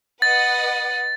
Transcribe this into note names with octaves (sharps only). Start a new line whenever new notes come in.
B4 D#5 F#5 A6